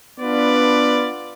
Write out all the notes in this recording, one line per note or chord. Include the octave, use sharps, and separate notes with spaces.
B3 D4 F4 B4 D5